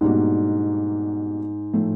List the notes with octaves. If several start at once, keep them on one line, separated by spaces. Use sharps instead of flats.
G#2 B2 G3 A#3 D4 F#4
A2 F3 A3